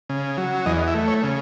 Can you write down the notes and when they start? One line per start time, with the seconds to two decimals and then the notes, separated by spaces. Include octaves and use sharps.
0.09 C#3
0.38 F#3
0.66 E2 D#5
0.88 E5
0.94 A3
1.08 C#5
1.23 C#3